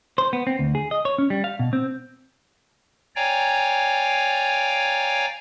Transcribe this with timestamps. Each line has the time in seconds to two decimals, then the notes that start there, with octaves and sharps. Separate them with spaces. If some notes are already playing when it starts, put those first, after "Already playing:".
0.18 C5
0.33 B3
0.47 C4
0.59 D2
0.75 G#4
0.91 D#5
1.05 C#5
1.18 C#4
1.30 G3
1.44 F5
1.59 B2
1.73 C4
3.16 C#5 D5 F5 G5 G#5 A#5